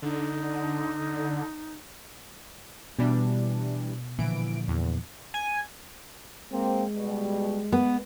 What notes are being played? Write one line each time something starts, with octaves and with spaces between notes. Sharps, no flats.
D3 D#4
B2 E3 G3 D4
A#2 D3 E3 F3 D7
E2
G#5
G#3 A#3 C4
B2 G3
B3